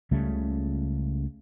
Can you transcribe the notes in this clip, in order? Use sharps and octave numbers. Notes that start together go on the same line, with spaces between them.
C#2 C#3 G3 A3